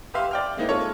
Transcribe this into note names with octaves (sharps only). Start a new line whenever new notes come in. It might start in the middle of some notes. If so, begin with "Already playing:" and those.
G4 B4 E5 F5 C6
D5 G5 F6
G#3 A#3 C4 D#4 E4
G#3 F4 A4 C#5